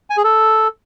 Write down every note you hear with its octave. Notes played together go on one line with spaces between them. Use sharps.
G#5
G#4
A4